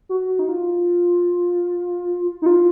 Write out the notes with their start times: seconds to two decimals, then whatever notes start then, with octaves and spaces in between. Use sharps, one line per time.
0.09 F#4
0.39 D#4
0.49 F4
2.42 D#4
2.46 F4